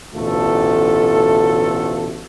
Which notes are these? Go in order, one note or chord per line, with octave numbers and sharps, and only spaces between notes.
A1 D2 B2 A3 F4 A4